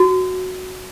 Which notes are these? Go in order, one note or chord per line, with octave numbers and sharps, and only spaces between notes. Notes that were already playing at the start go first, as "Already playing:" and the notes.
Already playing: F#4